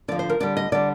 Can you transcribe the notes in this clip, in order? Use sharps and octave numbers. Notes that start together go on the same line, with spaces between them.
D3 F3 D5
C5
A#4
D3 G3 D5
D#5
D3 G3 D5